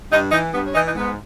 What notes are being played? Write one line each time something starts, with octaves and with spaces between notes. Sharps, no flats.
G2 D#4
E3 D#4
G2 B3
C#4
E3 D#4
D#4
G#2 B3